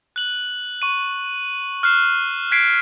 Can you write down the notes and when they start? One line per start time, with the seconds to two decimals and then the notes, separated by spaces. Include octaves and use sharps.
0.16 F#6 F#7
0.82 C#6 D#7
1.83 F6 F#6 C7 E7
2.52 F#6 G#6 B6 C7 D7